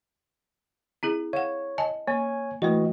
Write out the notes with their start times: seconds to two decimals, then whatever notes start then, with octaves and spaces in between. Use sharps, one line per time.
1.03 C4 E4 G#4
1.33 C#5 F5 F#5
1.78 D#5 G#5 A5
2.08 A#3 C#5 G#5
2.62 E3 A3 F#4 B4 D#5